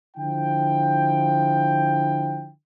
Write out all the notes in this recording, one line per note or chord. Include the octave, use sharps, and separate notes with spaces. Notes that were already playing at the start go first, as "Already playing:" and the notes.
D3 F3 E4 G5